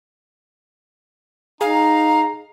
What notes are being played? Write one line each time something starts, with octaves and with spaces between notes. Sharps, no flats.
D#4 G#4 F5 A#5